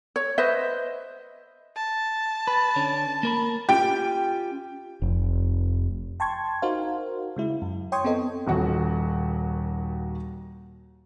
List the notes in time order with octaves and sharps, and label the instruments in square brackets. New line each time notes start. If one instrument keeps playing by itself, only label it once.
[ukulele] C#5
B4 C5 D#5 E5
[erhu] A5
[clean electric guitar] B4
D3 C#4
A#3 A#4 B5
[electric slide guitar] C#4 F4 G4 [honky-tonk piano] G5
[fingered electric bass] F1
[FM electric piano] G5 A5 C6 C#6 G#6
D#4 F#4 A#4 C5 F5
C#3 G#3 E4
F#2
C#5 G5 C6 C#6 D#6 G#6
B3 C4 A4 D#5
[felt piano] D#1 D#2 F#4 F#5